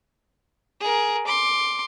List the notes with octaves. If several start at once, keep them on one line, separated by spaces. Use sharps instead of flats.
G#4 A#4
C6 D6